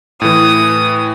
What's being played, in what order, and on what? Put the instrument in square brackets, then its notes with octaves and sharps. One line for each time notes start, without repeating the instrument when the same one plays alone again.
[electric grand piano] A2 E3 [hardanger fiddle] D#6